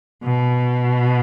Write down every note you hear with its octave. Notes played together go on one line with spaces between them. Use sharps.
B2